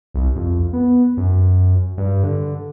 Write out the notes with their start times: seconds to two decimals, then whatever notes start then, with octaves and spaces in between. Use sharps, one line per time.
0.14 C2
0.36 F2
0.73 B3
1.17 F#2
1.97 G2
2.24 D3